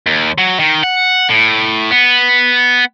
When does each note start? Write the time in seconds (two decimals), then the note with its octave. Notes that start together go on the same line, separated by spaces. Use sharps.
0.07 D#2
0.38 F#3
0.59 D#3
0.84 F#5
1.29 A2
1.91 B3